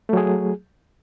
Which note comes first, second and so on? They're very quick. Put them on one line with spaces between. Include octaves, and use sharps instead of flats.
A3 F#3 G#4